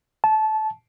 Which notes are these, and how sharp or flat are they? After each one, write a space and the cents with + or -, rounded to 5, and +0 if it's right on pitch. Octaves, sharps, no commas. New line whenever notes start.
A5 -20